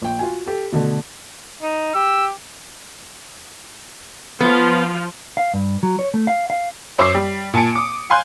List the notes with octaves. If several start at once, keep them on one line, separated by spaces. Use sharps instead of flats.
A#1 G5
F4 F#4 G#5
G4 A4
B2 D3 A3
D#4
G4 E6
F3 B3 F4
F5
G2
F#3
C#5
A3
F5
F5
F#2 C5 C#5 D6 E6 C7
G3
A#2 G#5 A5 C#7 D7
D6 D#6
F5 G#5 C6 F#6 G6